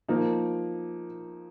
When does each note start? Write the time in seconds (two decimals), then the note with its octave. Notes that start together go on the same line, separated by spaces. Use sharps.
0.08 F3 A#3 D#4